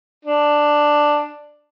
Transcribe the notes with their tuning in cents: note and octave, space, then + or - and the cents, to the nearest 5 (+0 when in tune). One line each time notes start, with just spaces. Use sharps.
D4 +5